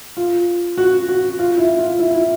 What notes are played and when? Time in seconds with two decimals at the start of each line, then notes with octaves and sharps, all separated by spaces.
0.17 F4
0.78 F#4
1.09 F#4
1.39 F4
1.58 E4
1.79 F4
1.99 E4
2.14 E4